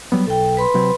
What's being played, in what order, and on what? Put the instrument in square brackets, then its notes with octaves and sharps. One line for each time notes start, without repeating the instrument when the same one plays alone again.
[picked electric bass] F#3 G3 B3
[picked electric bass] B1 [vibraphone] A4 G5
[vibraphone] B4 B5 C6
[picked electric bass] C3 F#3 C4